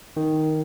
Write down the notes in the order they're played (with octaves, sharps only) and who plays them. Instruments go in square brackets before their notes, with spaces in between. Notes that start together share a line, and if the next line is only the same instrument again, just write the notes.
[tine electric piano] D#3